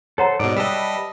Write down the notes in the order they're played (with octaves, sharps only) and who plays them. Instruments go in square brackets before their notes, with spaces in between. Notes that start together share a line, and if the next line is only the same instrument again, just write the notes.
[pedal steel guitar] A4 C5 [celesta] C#5 F#5 A#5
[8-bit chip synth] G#2 B2 [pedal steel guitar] D5 D#5
[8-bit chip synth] G3 D#5 [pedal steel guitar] B4 E5 A5